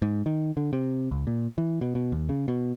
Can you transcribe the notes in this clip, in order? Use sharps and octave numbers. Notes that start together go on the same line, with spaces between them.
G#2
D#3
D3
C3
C#2
A#2
E3
B2
B2
D#2
C#3
B2